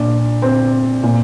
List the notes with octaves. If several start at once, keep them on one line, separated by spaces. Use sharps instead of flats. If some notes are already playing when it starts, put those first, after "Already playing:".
Already playing: A#2 D4
C4
A#2